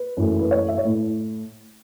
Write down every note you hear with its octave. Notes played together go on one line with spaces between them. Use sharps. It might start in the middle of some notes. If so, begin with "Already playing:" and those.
Already playing: B4
F#2 E3 A3
B4
C#5
E5
C#5
A2